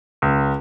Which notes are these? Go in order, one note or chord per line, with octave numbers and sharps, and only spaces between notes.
C#2